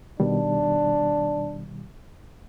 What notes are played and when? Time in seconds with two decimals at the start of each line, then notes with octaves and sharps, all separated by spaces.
0.20 B2 D#3 G3 D4